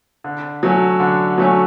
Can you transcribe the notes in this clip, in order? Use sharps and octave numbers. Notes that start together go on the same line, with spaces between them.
D3
F#3 A3 C#4
D3
F#3 A3 C#4